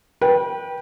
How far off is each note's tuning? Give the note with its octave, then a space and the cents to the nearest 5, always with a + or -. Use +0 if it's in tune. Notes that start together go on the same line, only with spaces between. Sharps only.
B4 -30 G5 +0